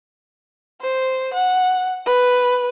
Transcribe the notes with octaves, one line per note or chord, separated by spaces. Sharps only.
C5
F#5
B4